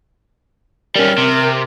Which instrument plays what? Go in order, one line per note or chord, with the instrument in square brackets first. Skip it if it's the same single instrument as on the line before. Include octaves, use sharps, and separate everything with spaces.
[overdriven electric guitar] G3 C#4 [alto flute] A#4
[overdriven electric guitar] C3